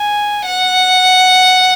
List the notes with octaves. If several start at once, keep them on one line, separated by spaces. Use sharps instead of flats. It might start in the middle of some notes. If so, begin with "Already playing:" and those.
Already playing: G#5
F#5